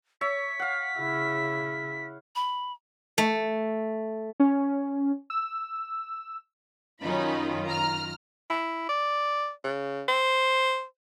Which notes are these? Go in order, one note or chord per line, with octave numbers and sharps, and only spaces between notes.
C#5 E5 B6
F5 F#5
C#3 E4
B5
A3
C#4
E6
F#2 D#3 C#4 D#4 F4 B5
A#5 F6
E4
D5
C#3
C5